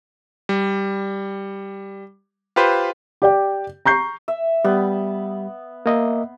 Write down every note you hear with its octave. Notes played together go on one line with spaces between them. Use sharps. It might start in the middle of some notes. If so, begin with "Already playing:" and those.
G3
F4 G4 B4 C5
G4 D5 G5
A#5 C#6 G6 C7
E5
G3 B3
A#3 D#5 E5